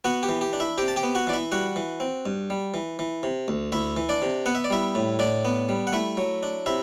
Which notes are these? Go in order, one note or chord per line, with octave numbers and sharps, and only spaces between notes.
B3 F#4 F#5
G4
E3
G4
D4
E4 E5
C3 G4 G5
A5
G4 G5
B3
F#4 F#5
E3 D5
E4 E5
G3 F#4 F#5
E3
C4
G2
G3
E3
E3
C3
D2
D2 E4 E5
E3
D4 D5
C3
B3 F#5
E5
D5
G3 E4 E5
A2
A2 D4 D5
B3
G3
F#5
A3 E4 E5
F#3
D4
C3 E4 E5